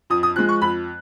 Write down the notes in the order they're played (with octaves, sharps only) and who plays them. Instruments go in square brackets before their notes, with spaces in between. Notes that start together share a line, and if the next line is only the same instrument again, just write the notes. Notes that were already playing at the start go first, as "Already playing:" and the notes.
[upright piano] F2 D#6
D#6
F3 F#6
G#3
C#6
F2 B5